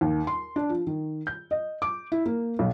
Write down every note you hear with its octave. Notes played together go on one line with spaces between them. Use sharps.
D#2
C6
D4
F3
D#3
G6
D#5
D6
E4
A#3
B1